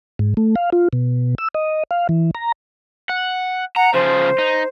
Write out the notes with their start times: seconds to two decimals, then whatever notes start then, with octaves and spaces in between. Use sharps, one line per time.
0.19 G#2
0.37 A3
0.56 F5
0.72 F4
0.93 B2
1.38 E6
1.55 D#5
1.91 F5
2.09 E3
2.35 A#5
3.09 F#5
3.76 F#5 A#5
3.94 C#3 F3 C5
4.38 D#4